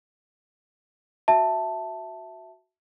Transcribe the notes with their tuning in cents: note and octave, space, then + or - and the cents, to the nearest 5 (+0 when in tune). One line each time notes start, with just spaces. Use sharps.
F#4 +0 E5 +0 A5 +0